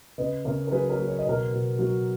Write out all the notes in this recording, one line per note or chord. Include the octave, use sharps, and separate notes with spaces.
C#3 B4 D#5
C#3 A#4 C#5
A#4
F#3 G#4 B4
A#4 C#5
F#3
C#5
D#5
B2 A#4 C#5
B2
F#3